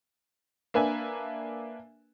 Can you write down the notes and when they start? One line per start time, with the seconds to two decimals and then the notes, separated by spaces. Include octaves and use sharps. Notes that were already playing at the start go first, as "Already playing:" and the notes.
0.74 A#3 D4 B4 E5 G#5